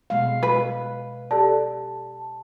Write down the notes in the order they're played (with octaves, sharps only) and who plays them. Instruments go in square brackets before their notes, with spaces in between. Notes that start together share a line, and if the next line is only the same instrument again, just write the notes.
[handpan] B2 G#3 F5
[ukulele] B4
[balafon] G4 A4 D5 [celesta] A5